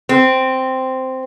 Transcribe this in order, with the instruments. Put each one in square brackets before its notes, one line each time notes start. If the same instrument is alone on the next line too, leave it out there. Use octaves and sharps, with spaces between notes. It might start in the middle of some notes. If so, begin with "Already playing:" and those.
[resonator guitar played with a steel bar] C4